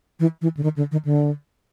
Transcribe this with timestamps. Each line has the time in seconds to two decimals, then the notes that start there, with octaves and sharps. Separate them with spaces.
0.20 E3
0.42 E3
0.57 D3
0.63 D#3
0.77 D3
0.92 D#3
1.05 D3